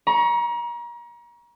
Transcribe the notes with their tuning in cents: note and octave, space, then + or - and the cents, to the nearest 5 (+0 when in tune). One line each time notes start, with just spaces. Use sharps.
A#5 +35 C#6 +5